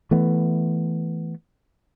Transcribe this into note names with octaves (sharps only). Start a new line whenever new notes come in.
E3 A3 B3